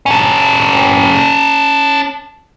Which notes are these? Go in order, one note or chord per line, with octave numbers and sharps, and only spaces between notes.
C#4 A4